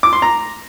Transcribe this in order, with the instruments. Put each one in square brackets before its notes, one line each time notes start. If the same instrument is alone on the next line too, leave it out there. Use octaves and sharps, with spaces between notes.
[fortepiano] D6
C6
A#5